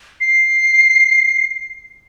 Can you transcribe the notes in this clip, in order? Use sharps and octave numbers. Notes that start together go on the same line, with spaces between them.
C7